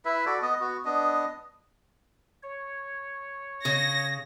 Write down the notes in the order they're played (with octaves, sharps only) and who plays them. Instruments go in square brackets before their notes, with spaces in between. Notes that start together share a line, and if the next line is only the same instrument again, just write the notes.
[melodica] E4 B4 E5
F#4 A4 D5
B3 D#5
B3 F#4
B3 D4 D#5
[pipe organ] C#5
[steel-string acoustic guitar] C#3 [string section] A#6